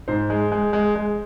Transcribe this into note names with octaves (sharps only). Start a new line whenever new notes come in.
G#2 C5
G#3
G#3
G#3
G#3